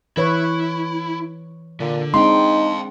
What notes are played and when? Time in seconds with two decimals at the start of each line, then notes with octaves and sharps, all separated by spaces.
0.17 E3 E4 B4 C#5
1.80 A#2 D3
2.14 G#3 C4 D4 D#4 F5 G5 C6